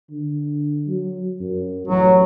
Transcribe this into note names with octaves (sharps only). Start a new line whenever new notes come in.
D3
F#3
F#2
A1 F#3